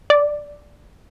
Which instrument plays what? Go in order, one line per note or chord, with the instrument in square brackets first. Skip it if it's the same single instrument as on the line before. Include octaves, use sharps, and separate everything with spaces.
[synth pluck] D5